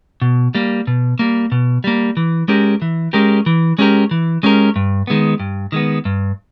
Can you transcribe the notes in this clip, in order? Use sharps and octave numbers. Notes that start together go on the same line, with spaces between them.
B2
G3 A#3
B2
G3 A#3
B2
G3 A#3
E3
G#3 C#4 G4 A#4
E3
G#3 C#4 G4 A#4
E3
G#3 C#4 G4 A#4
E3
G#3 C#4 G4 A#4
G2
D#3 G#3 B3
G2
D#3 G#3 B3
G2